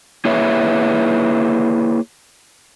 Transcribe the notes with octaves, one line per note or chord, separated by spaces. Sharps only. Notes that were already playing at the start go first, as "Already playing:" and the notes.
A#3 E4 G#4 B4 C#5 E5